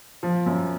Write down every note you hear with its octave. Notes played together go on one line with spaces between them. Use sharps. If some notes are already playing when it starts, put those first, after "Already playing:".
F3
F#2